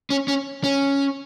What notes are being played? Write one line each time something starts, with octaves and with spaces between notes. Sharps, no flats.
C#4
C#4
C#4